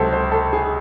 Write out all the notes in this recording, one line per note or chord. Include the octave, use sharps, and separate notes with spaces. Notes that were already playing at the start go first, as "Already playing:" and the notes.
Already playing: C#2 C3 F#3 A4 C5
C5
A4
G#4